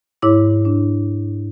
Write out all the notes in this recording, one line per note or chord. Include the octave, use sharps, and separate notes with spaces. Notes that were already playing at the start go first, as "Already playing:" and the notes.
G#2 E4 C#5 D6
D4